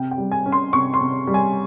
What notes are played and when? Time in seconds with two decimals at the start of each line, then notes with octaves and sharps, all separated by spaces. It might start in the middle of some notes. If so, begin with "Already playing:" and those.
Already playing: C3 G5
0.11 G5
0.18 G3
0.32 G#5
0.46 C#4
0.52 C6
0.73 C3 C#6
0.94 C6
1.00 C3
1.27 G3
1.34 G#5